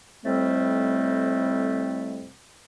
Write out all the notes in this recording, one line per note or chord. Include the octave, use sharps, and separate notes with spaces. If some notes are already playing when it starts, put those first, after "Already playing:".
F2 A2 C3 G3 A3 C4